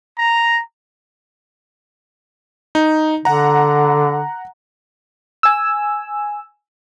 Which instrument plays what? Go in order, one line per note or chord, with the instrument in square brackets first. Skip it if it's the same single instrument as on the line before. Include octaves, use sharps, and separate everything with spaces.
[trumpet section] A#5
[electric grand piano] D#4
[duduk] D3 [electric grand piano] F#5 A#5
[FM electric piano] G#5 E6